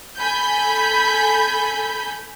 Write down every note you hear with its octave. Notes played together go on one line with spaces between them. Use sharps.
A4 G#5 B5 G6